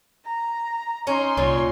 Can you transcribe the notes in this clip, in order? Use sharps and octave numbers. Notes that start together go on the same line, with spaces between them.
A#5
C#4 D#4 A#4 C#5 C6
C2 A#2 C#5